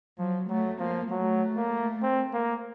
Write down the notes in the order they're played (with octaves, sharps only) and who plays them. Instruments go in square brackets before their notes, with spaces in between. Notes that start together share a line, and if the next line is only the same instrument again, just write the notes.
[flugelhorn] F3 [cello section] F#3
[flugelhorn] F#3 [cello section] A3
[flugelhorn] F3 [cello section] A#3
[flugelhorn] F#3 [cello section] A3
[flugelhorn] A#3
C4
A#3